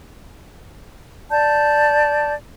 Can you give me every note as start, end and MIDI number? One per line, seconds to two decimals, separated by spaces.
1.31 2.33 74
1.31 2.33 81
1.31 2.33 91